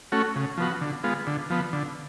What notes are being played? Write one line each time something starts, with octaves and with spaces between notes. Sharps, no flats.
A3 C#4 F#4
C#3
F3 B3 F#4
D3
G#3 B3 F4
D3
F3 B3
D3